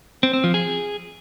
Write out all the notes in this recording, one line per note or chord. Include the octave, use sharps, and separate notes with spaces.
C4
C4
F3
G#4